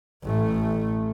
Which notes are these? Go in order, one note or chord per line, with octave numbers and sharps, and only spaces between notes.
A1 A3